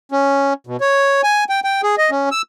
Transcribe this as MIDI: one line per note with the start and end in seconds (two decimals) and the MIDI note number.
0.12 0.53 61
0.67 0.77 47
0.81 1.21 73
1.23 1.44 80
1.49 1.60 79
1.64 1.81 79
1.83 1.95 68
1.98 2.10 75
2.11 2.29 61
2.32 2.42 88